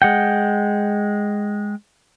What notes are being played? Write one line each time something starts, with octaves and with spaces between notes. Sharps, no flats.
G#3 F#5 G5